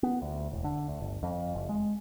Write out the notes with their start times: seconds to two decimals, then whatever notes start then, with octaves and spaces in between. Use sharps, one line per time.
0.03 B3
0.22 D2
0.52 E1
0.64 D3
0.88 D2
1.01 G1
1.23 F2
1.55 F#1
1.69 G#3